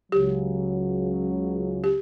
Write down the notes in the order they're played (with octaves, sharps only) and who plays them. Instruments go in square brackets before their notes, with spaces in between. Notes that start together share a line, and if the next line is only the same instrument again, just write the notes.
[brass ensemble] C#2 C#3 F#3 [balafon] G4
[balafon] G4